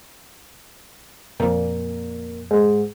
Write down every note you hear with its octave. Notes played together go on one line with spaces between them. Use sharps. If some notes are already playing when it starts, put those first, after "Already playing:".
F2 A#2
G#2